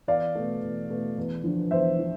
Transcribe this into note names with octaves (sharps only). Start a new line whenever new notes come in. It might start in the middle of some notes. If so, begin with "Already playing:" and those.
E2 D5 F5
B2 A3
E2
B2 A3
E2
D3 F3
E2 C5 E5
F3